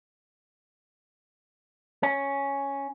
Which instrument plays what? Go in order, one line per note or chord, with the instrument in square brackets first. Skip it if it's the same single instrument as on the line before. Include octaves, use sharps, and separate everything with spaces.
[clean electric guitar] C#4